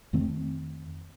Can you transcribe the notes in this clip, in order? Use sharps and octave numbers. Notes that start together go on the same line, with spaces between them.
F2 D#3 A3 C4